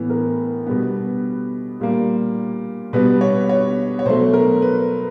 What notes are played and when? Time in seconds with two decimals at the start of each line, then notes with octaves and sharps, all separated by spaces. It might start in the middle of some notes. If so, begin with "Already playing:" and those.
Already playing: A2 E3 B3
0.10 A#4
0.66 B2 G3 B3
1.80 A#2 G3 A#3
2.93 B2 G3 B3 B4
3.21 C#5
3.49 C#5
3.99 C#5
4.06 B2 F#3 A3 C5
4.34 A#4
4.62 B4